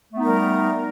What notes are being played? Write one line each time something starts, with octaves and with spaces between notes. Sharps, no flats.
G3 A3 B3 D#4 A#4